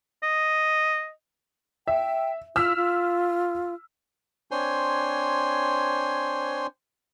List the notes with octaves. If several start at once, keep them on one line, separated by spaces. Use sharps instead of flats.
D#5
E5 G5
F4 E6 F6 B6
F4
C4 D4 C5 C#5 G#5 C6